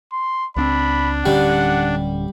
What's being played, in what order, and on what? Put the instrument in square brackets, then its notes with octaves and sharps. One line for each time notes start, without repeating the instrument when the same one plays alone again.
[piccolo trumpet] C6
[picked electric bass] C#2 B3 C4 [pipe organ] D4 [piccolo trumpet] B5
[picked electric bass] D1 D3 C#4 [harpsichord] G3 [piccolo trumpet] F#5